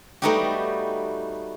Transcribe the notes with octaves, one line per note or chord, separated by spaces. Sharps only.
G3 A3 B3 D#4 F#4 G4